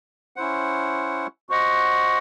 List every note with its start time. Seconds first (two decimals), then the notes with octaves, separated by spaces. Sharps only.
0.36 C#4 E4 C5 F#5
1.49 F#4 C5 D#5 F#5